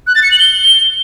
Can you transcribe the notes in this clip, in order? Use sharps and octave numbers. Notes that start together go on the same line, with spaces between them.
F#6
A6
C#7
F#7
G7